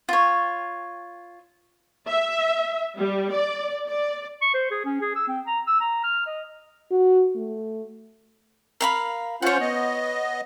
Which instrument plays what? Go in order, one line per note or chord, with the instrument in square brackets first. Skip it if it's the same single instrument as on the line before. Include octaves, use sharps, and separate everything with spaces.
[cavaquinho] F4 C#5
[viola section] E5
G3
D5
D5
[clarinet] C#6
C5
G#4
C#4
G#4
E6
C4
A#5
E6
A#5
F6
D#5
[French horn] F#4
A3
[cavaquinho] A#4 F5 B5
[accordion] C#4 F4 C5 [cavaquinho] C#5 F#5
[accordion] B3 D#5